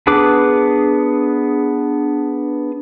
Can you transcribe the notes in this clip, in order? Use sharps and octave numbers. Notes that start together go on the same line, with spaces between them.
B3 D4 G#4 B4 D6